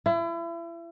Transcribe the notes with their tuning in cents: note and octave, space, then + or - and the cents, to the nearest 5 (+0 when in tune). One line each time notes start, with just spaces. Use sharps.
E4 +35